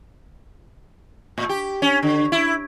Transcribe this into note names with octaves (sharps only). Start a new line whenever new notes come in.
A2
G4
C#4
D3
E4